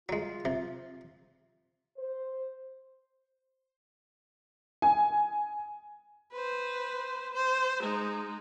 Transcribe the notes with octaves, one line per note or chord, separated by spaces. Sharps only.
F#3 G#3 F4
C3
C5
G#5
B4 C5
C5
G#3 D#4